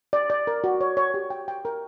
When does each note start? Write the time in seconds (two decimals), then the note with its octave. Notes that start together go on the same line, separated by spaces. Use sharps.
0.13 D5
0.30 D5
0.47 A#4
0.64 F#4
0.81 C#5
0.97 C#5
1.14 G4
1.30 G5
1.48 G5
1.65 A#4